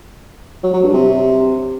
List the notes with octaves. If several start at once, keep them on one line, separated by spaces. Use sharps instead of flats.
F#3
F#3
G2
C3